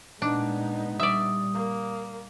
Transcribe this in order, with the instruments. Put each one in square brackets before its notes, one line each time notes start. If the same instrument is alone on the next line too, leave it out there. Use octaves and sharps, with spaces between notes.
[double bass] A#2 G#3 [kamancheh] B3 D#4 [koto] D4
[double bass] A#2 G3 [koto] D5 E5 [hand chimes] D#6
[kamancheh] A#3